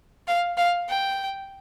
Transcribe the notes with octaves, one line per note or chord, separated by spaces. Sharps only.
F5
F5
G5